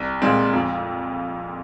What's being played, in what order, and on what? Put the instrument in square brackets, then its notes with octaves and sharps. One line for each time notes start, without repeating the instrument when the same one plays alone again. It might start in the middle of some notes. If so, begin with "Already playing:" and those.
Already playing: [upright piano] C2
A#2 G#3 C4
F2